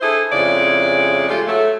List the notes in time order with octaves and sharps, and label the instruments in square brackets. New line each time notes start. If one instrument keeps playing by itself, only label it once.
[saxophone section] D4 E4 G#4 A4 C5
F2 C#3 G#3 E4 D5
G#3 A3 F4 G4 G#4
F#3 A3